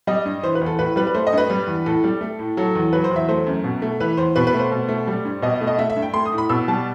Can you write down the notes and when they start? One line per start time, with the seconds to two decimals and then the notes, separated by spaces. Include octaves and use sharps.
0.07 G3 D#5
0.26 G2
0.43 E3 C5
0.55 B4
0.61 E2 A4
0.79 A2 B4
0.96 G3 B4
1.07 B4
1.15 A3 C5
1.27 D#5
1.33 G2 B4
1.50 G3
1.67 E2
1.86 A2 A4
2.04 G3
2.21 A3
2.39 A2
2.57 F#3 A4
2.75 E2
2.93 F#3 B4
3.04 C5
3.11 E2
3.16 E5
3.29 A3 C5
3.47 F#2
3.64 B2
3.82 A3
4.00 E3 B4
4.17 E2 C5
4.36 B2 B4
4.47 B4
4.53 A3
4.59 C5
4.72 B2
4.89 A3
5.07 G3
5.25 G2
5.42 B2 D#5
5.61 A3
5.67 D#5
5.79 A3 E5
5.90 E5
5.96 G2
6.02 G5
6.13 A3 C6
6.26 D#6
6.33 A2
6.38 B5
6.49 B2 E6
6.68 G3 A5